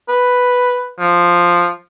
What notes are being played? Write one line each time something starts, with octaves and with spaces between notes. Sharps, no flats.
B4
F3